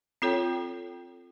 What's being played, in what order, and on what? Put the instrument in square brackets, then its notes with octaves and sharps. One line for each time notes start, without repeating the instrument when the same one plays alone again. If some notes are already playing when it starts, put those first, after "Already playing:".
[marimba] C4 F4 A4 C#5 G5